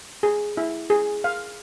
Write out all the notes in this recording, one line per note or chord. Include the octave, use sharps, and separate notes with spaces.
G#4
E4
G#4
F5